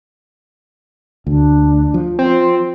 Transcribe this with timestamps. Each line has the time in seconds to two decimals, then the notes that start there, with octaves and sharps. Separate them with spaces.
1.27 D2 D4
1.94 F3
2.19 C4 F4